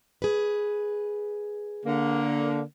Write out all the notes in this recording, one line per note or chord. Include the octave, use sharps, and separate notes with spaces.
G#4 B4
D3 A#3